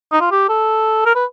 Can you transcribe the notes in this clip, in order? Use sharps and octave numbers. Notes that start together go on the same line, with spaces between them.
D#4
F4
G4
A4
A#4
B4